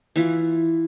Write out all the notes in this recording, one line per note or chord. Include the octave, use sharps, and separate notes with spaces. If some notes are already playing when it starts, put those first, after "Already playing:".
E3 E4 F4